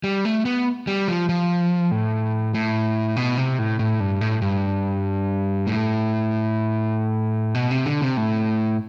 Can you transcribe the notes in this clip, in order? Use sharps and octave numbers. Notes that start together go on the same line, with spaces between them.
G3
A3
B3
G3
F3
F3
A2
A2
B2
C3
A2
A2
G2
A2
G2
A2
B2
C3
D3
C3
A2